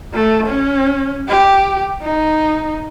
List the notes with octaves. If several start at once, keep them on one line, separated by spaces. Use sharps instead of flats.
A3
C#4
G4
D#4